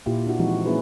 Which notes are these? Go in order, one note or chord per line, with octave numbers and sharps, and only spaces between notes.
A#2 A#3 E4 F4 G4
D4 E4 F#4
E3 F3 G#3 C4 D#4 F#4
A#3 C4 C#4 E4 G#4 B4